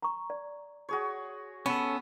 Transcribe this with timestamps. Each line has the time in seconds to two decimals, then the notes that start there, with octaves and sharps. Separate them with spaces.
0.02 A#5 C#6
0.30 D5
0.89 F#4 G#4 C#5
1.66 B3 C#4 A4